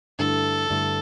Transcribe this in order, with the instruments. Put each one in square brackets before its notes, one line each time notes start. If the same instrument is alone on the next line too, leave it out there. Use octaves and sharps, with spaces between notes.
[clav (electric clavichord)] G2 D3 A3 E4 [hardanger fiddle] A4
[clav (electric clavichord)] G2 D3 A3 E4